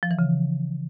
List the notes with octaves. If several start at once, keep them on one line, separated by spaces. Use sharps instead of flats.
F3
E3
C#3